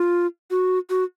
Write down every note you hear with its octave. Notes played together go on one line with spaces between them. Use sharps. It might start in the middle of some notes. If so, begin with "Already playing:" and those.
Already playing: F4
F#4
F#4